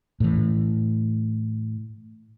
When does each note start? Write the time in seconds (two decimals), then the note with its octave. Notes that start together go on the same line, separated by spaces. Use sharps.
0.20 A2 E3